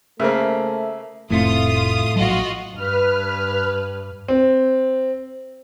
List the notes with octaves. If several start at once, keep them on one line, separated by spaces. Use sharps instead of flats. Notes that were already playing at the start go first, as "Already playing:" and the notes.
C#3 A3 A#3 A#4 C5 E5
F1 A2 A3 C4 F4 D#6
A#1 F#3 F4 F#4 D#5
G2 B4 F6
C4